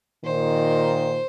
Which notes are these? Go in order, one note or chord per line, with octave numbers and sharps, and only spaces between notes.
A#2 D#3 C5